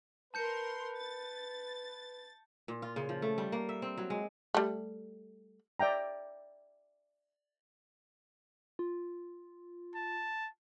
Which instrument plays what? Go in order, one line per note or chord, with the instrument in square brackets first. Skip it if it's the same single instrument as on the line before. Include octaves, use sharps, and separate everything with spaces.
[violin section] A#4 C6 [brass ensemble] B4 [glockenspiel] A5 G6 C#7
[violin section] A6
[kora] A#2
F4
C#3
F3
A3
G3
A#3
E5
C4
F#3
G#3
[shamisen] G3 A3
[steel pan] D5 E5 G5 A#5
[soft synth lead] F4
[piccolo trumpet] A5